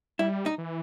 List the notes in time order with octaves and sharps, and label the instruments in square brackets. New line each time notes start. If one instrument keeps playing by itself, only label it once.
[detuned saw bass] G3 [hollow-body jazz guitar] E4
[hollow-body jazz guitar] D#4
[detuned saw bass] E3